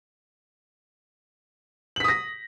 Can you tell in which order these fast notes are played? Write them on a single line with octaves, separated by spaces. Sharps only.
F#7 B6 D#6 A#6